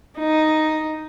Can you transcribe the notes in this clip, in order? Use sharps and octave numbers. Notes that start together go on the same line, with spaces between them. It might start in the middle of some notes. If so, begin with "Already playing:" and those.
D#4